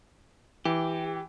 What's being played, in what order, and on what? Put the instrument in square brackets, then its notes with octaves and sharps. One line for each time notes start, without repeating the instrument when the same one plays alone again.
[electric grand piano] E3 [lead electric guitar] G4